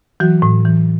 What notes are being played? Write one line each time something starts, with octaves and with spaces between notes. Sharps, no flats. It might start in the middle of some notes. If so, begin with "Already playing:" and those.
E3 F#3 F#4
A2
E3